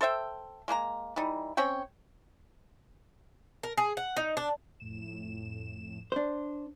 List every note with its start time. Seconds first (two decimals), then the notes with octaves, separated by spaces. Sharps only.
0.01 A4 C5 E5 G5
0.68 G#3 A#3 G4 A#5
1.16 E3 G3 D#4
1.57 C4 C#4 C#5 G5
3.63 A#4
3.78 G#4
3.97 F#5
4.17 D#4
4.37 D4
4.80 F2 A2 E7
6.12 D4 C5